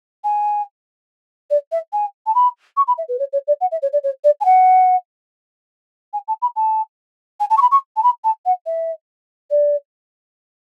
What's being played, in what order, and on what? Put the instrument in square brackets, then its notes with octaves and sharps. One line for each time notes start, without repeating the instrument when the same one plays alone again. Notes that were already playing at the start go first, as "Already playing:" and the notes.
[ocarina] G#5
D5
E5
G#5
A5
B5
C#6
B5
E5
B4
C#5
C#5
D5
F#5
E5
C#5
D5
C#5
D5
G#5
F#5
G#5
A5
B5
A5
G#5
A5
C#6
B5
C#6
A5
B5
A5
F#5
E5
D5